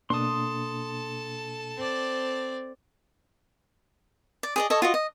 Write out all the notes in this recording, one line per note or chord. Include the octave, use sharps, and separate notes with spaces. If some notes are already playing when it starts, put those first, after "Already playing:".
B2 A#3 D4 A4 A5 C6 D#6
C4 D5
D5
G#4 D5 D#5
A4 C#5 D#5
F4 F#4 D#5
D#5